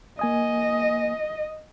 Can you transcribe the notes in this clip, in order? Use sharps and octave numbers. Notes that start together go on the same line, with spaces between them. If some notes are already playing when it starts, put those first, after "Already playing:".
A#3 D#5 G#5 D#6